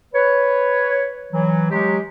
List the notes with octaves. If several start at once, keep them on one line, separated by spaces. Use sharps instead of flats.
B4 C#5
E3 F#3
F#3 G#3 G4